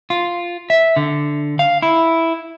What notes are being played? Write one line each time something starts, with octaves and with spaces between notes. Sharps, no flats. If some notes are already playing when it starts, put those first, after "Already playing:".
F4
E5
D3
F5
E4